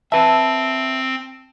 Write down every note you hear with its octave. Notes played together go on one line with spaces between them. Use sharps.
C4 B4 E5 A5